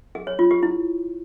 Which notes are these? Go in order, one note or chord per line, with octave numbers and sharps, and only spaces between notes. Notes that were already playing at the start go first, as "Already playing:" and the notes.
G#4
C#5
F4
G4
E4